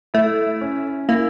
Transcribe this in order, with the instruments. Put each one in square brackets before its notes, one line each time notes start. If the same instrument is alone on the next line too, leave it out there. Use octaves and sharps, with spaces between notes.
[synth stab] A3 [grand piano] E4
[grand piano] C#4
[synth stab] A#3 [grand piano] E4